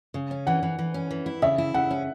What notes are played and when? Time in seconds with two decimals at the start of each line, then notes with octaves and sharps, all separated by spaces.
0.14 C#3
0.31 C#4
0.47 E3 F#5
0.63 E3
0.79 E3
0.94 C#4
1.11 E3
1.26 E4
1.42 C#3 E5
1.58 E4
1.74 C#3 F#5
1.91 C#4